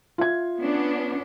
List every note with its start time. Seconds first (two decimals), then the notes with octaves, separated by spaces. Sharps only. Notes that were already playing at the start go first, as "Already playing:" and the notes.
0.18 F4 E5 G#6
0.60 B3 C#4 D4